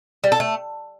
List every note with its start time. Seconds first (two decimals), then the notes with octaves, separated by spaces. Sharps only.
0.24 G3
0.32 A4
0.40 A3